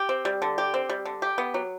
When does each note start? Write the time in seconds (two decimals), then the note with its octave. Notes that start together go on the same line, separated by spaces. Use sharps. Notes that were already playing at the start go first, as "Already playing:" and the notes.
Already playing: G4
0.09 C4
0.25 G3
0.42 D3
0.58 G4
0.74 C4
0.89 G3
1.05 D3
1.22 G4
1.38 B3
1.54 F#3